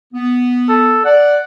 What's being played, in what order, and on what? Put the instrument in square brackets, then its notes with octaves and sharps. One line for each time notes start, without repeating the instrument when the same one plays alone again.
[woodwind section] B3
[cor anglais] A4
[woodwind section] D5 [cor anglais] F#5